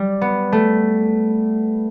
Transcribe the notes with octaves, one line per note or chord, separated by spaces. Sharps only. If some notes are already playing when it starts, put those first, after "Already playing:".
Already playing: G3
B3
A3